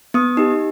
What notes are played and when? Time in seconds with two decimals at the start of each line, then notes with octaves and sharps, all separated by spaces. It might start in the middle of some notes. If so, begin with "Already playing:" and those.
0.14 B3 D#6
0.37 D#4 G4